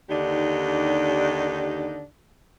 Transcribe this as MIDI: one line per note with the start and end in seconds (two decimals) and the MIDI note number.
0.09 2.03 39
0.09 2.03 50
0.09 2.03 62
0.09 2.03 63
0.09 2.03 67